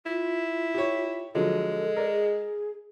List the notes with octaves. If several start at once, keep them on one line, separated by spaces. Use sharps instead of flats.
E4 F4
G4 C#5
D3 F3 F#3 G#3 A4
A#4 D5
G#4